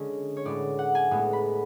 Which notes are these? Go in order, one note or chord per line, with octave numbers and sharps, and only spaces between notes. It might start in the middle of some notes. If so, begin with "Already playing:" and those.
Already playing: D3 G#3 C#4
C#5
A2 G#3 B3 D5
F#5
G#5
A2 G#3 B3
B5